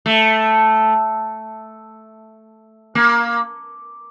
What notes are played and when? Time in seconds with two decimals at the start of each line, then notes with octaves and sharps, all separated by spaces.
0.06 A3
2.95 A#3